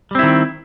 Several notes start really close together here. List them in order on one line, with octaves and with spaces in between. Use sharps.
G3 C4 E4 D#3